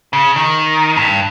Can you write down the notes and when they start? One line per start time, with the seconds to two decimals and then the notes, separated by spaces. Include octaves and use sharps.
0.13 C#3
0.36 D#3
0.97 G2